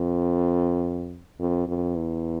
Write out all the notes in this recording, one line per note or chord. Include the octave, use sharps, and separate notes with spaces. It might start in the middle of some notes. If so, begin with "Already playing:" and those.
Already playing: F2
F2
F2
E2